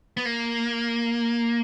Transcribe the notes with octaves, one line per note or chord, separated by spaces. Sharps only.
B3
A#3